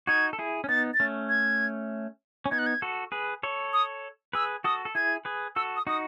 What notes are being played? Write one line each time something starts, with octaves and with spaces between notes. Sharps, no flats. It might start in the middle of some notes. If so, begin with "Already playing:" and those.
D#4 F#4 G#6
A4
E4 G#4
C#4
B3 D#4 A6
A6
A3 C#4
G#6
C#4
B3 D#4 G#6
F#6
G#6
F#4 A4
G#4 B4
A4 C#5
D#6
G#4 B4 E6
F#4 A4 D#6
A4
E4 G#4 G#6
G#4 B4
F#4 A4 E6
D#6
D#4 F#4 D#6